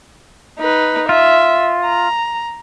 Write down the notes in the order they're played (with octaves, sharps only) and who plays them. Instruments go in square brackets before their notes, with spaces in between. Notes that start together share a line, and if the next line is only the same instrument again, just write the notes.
[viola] D#4 B4
[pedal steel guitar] F4 [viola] E5
[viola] A#5